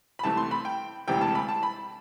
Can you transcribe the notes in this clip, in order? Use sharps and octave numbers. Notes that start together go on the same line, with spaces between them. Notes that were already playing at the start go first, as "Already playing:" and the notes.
B5
C2 C3 E3 A3 A5
C6
B5
G5
E1 D2 C3 E3 G3 G5
A5
B5
A5
B5